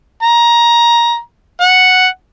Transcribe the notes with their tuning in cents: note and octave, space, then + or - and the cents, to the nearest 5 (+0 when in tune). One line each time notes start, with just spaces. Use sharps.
A#5 +15
F#5 +0